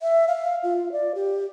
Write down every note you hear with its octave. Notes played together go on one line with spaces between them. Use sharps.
E5
F5
F4
D5
G4